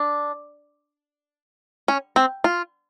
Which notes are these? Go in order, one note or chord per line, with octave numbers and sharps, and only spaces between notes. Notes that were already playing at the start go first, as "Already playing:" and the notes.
Already playing: D4
C#4
C4
F4